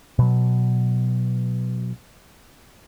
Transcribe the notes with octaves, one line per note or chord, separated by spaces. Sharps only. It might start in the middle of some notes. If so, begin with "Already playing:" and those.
B2 F#3